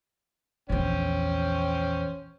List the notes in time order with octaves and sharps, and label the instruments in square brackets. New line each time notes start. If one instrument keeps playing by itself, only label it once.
[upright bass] A#1 E2 [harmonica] C#4 C5 G5